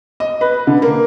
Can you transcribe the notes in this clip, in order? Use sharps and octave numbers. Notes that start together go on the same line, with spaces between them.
D#5
B4
D3
A#3